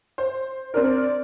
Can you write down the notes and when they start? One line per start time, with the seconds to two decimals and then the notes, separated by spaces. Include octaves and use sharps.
0.18 C5
0.74 C4 D4 A#4 D5